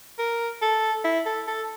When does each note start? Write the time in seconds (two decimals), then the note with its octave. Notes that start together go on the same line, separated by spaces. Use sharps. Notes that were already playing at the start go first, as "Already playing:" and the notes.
0.18 A#4
0.62 A4
1.04 E4
1.25 A4
1.47 A4